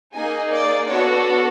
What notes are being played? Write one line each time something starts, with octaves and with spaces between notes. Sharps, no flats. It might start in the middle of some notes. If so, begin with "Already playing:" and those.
A#3 D#4 G#4 G#5
D5
B3 D4 F#4 A4 C#5